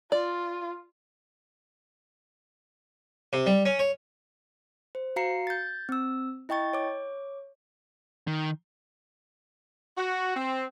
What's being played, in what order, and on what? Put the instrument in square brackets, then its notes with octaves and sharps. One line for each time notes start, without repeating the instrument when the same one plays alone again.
[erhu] F4 [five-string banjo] D5
[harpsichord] C3
G3
C#4
C#5
[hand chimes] C5
F#4 F5 A#5 C7 C#7
G6 A6
C4 E6
E4 D#5 G5 C#6 A6
C#5 D6
[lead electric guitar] D#3
[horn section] F#4
C4